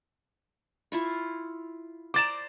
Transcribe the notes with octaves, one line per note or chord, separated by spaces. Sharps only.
E4 F4 C#6
C5 D5 A#5 D6 A6 E7